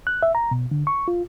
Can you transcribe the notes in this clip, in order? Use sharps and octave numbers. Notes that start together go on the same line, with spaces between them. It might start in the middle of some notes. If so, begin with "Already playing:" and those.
F#6
E5
A#5
B2
D3
C#6
F4